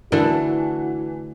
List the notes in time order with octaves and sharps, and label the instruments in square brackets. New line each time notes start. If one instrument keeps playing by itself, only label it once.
[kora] D3 A3 [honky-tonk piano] E3 [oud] E4 [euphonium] F#4